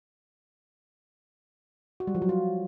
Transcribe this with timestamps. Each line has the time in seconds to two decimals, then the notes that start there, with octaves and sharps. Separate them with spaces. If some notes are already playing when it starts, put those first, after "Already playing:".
2.00 F#4
2.07 G3
2.15 F3
2.22 F#3
2.29 F4